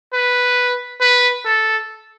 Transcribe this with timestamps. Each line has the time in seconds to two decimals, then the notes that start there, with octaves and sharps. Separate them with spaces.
0.13 B4
1.01 B4
1.45 A4